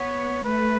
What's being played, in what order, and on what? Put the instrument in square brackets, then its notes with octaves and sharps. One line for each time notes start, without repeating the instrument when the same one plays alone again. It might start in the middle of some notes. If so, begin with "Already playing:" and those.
Already playing: [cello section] B3 [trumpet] C#5
[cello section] A3 [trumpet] B4